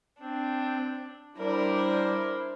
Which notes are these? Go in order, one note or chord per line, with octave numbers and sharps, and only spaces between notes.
C4 D4
G3 D4 E4 A#4 C5